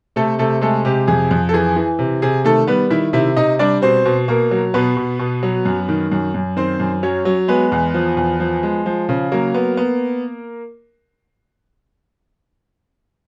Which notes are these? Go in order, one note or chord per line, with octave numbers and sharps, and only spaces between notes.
C3 A3 A4
C3 A3 A4
G#3 A3 A4
C3 G4
F2 G#4
F2
A4
E3 G#4
E3
C3
C3 G#4
D#3 A3 A4
G3 B3 B4
D#3 E4 E5
C3 E4 E5
C3 D#4 D#5
G3 D4 D5
B2 C4 C5
B2
B2 A#3 A#4
F#3
B2 B3 B4
B2
B2
F#3
F#2
D#3
F#2
F#2
D#3 C4 C5
F#2
F#3 C#4 C#5
F#3
G#3 B3 B4
E2
F3
E2
F3
G#3
F3
C#3
F#3 A#3 A#4
B3
B3